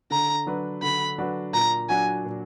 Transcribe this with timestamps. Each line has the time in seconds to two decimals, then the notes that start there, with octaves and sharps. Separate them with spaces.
0.11 D3 A#5
0.47 F#3 D4 F#4 B4
0.83 D3 B5
1.18 F#3 D4 F#4 B4
1.53 A#2 A#5
1.89 F#3 D4 F#4 G#5
2.26 A#2